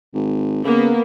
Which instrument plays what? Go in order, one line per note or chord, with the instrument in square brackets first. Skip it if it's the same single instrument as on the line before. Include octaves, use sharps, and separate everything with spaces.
[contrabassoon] G#1
[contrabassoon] C#3 [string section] A#3 B3